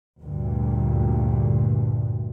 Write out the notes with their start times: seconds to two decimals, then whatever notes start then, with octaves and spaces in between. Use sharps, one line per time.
0.22 D2 G2 A#2